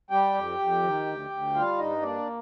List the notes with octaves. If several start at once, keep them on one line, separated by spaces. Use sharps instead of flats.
G3 G4 G5
F2
F2
D#3
D2
D2
G3 F4 F5
G2 D#4 D#5
A#3 D4 D5